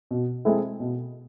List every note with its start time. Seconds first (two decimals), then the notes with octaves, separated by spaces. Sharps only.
0.11 B2
0.45 G#3 C4 E4 A4
0.80 B2